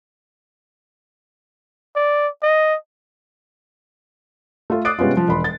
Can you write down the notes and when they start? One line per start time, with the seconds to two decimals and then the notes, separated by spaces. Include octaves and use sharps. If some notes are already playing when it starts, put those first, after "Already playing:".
1.96 D5
2.43 D#5
4.70 A3 F4
4.85 D6 D#6 F#6 A6 C7 D7
4.99 C3 G#3 B3 C#4 F4
5.17 F3
5.28 E1 B5 C6
5.44 A6